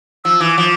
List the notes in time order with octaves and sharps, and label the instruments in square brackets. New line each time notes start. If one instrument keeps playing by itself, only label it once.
[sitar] F3 [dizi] E6
[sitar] E3 [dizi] D6
[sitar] F3